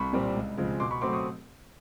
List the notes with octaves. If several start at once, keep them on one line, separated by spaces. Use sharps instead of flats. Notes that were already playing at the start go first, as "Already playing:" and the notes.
Already playing: C2 B5 C#6
A#2 G3 C4
C#2
C#3 F3 G#3 C4
B2 C6 D6
B5 C#6
F#3 A3 C4 C6 D6
C#6 D#6